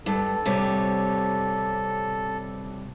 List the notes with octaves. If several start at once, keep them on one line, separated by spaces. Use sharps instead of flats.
G2 A4
C3 G3 C#5